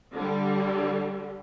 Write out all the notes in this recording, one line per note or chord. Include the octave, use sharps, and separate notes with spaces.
D3 G3